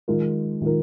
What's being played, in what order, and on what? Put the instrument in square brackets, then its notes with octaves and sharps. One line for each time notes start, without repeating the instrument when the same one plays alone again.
[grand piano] D#3 G#3 F4 A#4
D#3 G#3 F4 A#4